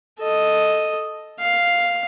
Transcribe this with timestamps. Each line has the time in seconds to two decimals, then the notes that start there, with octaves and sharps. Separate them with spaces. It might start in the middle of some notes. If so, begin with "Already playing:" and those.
0.20 A4 D#5
1.41 F5